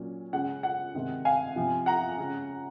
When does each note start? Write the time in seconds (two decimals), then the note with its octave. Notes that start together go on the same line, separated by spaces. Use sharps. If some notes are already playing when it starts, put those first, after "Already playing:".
Already playing: A#2 F#3 C#4
0.33 C#3 G#3 C#4 F#5
0.63 F#5
0.95 C3 D#3 G#3 C4
1.25 F5 G#5
1.56 C3 F3 C4
1.86 F#5 A#5
2.18 C#3 G#3 C#4